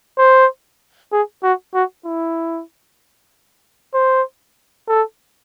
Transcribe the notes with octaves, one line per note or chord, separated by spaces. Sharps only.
C5
G#4
F#4
F#4
E4
C5
A4